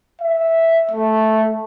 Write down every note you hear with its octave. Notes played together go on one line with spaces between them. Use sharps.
E5
A3